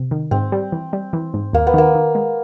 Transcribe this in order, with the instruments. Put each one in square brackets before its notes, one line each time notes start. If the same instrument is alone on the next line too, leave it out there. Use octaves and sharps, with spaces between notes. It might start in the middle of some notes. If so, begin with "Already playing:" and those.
Already playing: [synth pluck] C3
D#3
[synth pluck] G#2 [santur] C4
[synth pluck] G3
E3
G3
E3
G#2
[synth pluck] D#2 [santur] A#3
[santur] B3
[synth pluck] D#3 [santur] A#3
[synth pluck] D#3
G#3